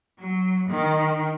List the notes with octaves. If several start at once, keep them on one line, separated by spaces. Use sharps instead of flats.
F#3
D#3